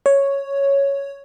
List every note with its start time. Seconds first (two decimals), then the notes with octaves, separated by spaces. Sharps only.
0.06 C#5